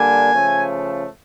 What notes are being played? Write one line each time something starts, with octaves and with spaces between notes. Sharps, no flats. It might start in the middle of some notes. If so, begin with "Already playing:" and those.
Already playing: D3 G3 A#3 D4 G#5
C#3 F3 A3